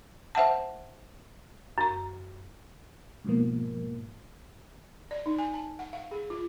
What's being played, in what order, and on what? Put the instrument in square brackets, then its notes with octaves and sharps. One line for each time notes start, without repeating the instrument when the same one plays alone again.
[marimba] C5 E5 F#5 A5
F#2 A#5
[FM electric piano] G#2 B2 F3 A#3
[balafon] D5
D#4
G#5
A5
F#5
F5
G#4
F4